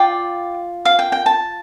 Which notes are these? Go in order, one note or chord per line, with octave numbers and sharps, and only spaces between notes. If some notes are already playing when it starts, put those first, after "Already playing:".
Already playing: F4 D5 G5
F5
G5
G5
A5